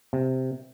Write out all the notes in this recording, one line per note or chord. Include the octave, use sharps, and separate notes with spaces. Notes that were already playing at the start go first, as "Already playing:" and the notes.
C3